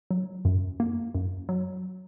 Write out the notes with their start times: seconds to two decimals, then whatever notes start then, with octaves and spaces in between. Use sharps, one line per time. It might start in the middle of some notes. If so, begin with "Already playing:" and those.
0.11 F#3
0.45 F#2
0.80 A#3
1.15 F#2
1.49 F#3